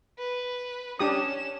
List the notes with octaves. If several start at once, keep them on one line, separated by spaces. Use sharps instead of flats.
B4
C#4 D4 G4 D#6 E7